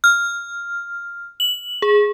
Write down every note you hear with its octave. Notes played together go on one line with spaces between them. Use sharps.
F6
F#7
G#4